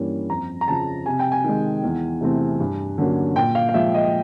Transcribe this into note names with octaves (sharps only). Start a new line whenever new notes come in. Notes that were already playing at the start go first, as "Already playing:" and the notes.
Already playing: G2 E3 G3 A#3 C#4
F2 A#5
A#5
C#3 F3 A5
C3 G#5
G5
G#5
D#3 G#3
E2
C3 E3 A3 C4
G2
D3 F#3 A#3 C#4
A#2 G5
F5
F5
F3 G#3 E5
D#5